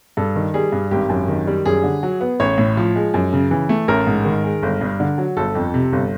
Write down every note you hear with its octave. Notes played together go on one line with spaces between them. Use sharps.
G2 A4
D#3
G3 G#4
G2
G#1 G4
F#2
D#3
G3
F#2 G#4
D3
F#3
B3
A1 C#5
A2
F3
G#3
F#2
C#3
E3
A3
A1 A#4
G#2
D#3
G#3
G1
G2
D3
F#3
G1 A4
F2
C3
G1